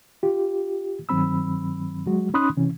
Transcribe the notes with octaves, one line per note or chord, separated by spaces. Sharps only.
F4 G4
G2 D#3 F#3 C4 B5 E6
F#3 G#3 F#4
C#4 D#4 B5 C6 D#6 F#6
C3 E3 C#4